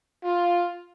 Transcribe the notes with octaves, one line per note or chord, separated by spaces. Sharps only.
F4